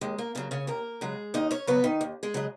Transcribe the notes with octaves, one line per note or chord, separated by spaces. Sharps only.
D#2 G#3
A#3
C#3 F#3 A#3
C#3 C#4
D#2 A#3 A#4
C#3 F#3 G#3 G#4
D#2 D#4 D#5
C#4 C#5
C#3 F#3 B3 B4
D#3 D#4
D#2
G#3 G#4
C#3 F#3 D#5